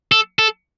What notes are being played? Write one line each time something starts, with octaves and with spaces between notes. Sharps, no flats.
A4
A4